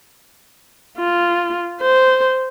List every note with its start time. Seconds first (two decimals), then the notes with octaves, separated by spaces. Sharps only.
0.98 F4
1.82 C5